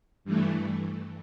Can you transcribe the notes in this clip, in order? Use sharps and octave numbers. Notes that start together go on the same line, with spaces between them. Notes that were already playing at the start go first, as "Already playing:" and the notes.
G2 E3 A3